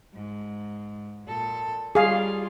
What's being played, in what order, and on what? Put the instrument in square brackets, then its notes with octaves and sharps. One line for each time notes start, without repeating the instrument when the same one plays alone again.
[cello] G#2
A#2 A4
[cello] G3 F4 [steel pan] G#4 F5